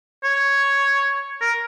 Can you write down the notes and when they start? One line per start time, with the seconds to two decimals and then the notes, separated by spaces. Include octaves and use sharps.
0.24 C#5
1.41 A#4